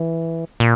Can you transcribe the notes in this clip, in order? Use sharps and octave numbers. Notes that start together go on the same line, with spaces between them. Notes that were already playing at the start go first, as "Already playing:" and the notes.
Already playing: E3
A#2